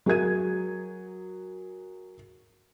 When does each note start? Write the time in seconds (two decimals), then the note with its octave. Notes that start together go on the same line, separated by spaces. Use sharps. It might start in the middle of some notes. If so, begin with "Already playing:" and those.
0.06 F#3 G#4 A#4 G#6 D#7